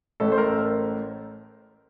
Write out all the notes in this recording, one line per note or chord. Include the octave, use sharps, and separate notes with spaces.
A1 A2 A3 A4
C5
A#4